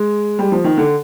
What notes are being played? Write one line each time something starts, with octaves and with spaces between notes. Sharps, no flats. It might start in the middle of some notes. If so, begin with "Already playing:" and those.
Already playing: G#3
G3
F3
D#3
D3